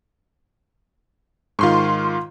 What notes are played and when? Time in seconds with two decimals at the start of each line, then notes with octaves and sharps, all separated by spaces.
1.59 G#2 D#3 F4 C6 C#6